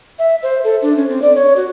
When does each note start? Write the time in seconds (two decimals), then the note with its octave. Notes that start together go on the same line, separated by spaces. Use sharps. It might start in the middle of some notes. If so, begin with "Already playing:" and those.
0.19 E5
0.43 C5
0.64 A4
0.82 D4
0.96 C#4
1.09 C4
1.22 D5
1.35 C#5
1.56 F#4